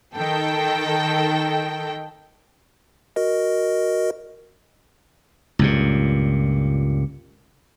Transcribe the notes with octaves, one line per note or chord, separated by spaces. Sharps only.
D#3 A4 G5
F#4 A#4 D#5
C#2 G2 A#2